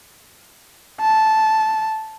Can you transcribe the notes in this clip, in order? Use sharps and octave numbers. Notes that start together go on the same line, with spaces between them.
A5